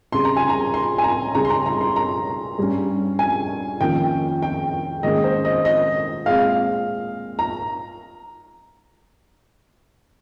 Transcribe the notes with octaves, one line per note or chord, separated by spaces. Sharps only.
C#3 G3 C4 C6
A#5
G#5
A#5
C6
G#5
A#5
C#3 G3 C#4 A#5
C6
A#5
A#5
C6
A#5
G2 G3 C#4
G#5
F2 D#3 A#3 C#4 G5
G5
G#2 D#3 A#3 C#4 D#5
C5
D#5
D#5
A#2 G#3 C4 F5
A#5